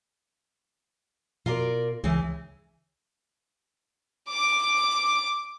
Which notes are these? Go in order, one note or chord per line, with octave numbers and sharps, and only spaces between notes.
B2 F4 A#4 D5
C#2 C#3 E3
D6